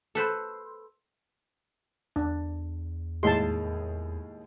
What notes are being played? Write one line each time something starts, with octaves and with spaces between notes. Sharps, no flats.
A4 B4 C5
E2 D4
D#2 A2 G#3 A5 C6